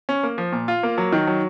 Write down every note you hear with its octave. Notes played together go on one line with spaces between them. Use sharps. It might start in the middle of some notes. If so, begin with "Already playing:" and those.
C#4
A#3
F3
A#2
F4
A#3
F#3
D#3
F#3